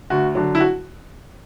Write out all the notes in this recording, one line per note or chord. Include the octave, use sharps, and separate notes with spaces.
D2 F#4
D3 F#3
E4
F#4